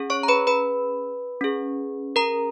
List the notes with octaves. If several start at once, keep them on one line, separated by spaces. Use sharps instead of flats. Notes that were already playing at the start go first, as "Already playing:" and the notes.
Already playing: C#4 G#4
C#5 C#6
A#5
B4 B5
B4 B5
C#4 G#4
A#4 A#5